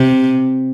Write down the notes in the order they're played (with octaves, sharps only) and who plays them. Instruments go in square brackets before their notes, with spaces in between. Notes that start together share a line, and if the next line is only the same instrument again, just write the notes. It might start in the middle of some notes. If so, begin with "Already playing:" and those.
Already playing: [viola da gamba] C3